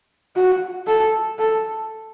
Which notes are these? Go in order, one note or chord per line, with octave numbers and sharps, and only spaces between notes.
F#4
A4
A4